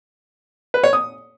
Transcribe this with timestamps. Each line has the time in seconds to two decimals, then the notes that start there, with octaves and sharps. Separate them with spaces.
0.74 B4
0.83 C#5
0.93 D#6